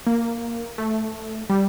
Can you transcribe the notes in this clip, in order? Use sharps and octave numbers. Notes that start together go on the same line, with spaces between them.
A#3
A3
G3